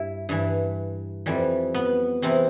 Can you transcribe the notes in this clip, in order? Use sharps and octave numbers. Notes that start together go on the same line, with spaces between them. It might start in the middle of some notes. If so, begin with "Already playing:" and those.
Already playing: G2 E4
G2 E3
F2 E3 G3
B3
E2 C3 E3 C4